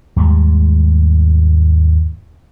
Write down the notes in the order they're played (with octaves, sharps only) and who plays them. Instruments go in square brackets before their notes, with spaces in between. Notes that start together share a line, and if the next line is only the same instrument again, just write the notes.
[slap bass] D#2 G#2 G3 G#3